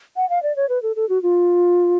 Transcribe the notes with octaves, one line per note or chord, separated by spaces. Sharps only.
F#5
F5
D5
C#5
B4
A4
A4
F#4
F4